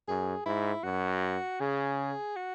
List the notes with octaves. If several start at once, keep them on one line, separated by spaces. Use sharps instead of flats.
F#2 G#4
G#2 E4
F#2 F#4
C#3 G#4
F#4